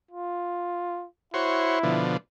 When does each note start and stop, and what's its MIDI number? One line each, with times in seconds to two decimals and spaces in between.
0.11 1.06 65
1.34 2.02 64
1.34 1.79 66
1.34 1.79 72
1.34 1.79 73
1.83 2.17 47
1.83 2.17 50
1.83 2.17 53